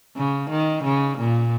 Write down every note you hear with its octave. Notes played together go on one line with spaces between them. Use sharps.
C#3
D#3
C#3
A#2